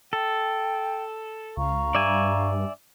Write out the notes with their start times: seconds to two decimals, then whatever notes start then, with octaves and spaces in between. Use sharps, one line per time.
0.13 A4 G5
1.57 C#2 F5 A#5 C#6
1.95 G2 D5 E5 G#5